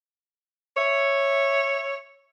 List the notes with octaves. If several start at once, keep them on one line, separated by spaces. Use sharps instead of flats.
C#5 E5